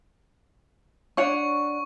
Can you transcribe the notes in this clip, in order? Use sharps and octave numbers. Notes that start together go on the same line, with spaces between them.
D4 C#5 F#5 C#6